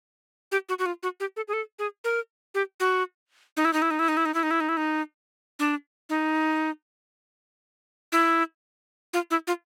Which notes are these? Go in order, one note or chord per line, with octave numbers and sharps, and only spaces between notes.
G4
F#4
F#4
F4
F#4
G4
A4
G#4
A4
G#4
A#4
G4
F#4
D#4
E4
D#4
E4
D#4
E4
D#4
E4
D#4
E4
D#4
E4
D#4
E4
D#4
D4
D#4
E4
F4
E4
F4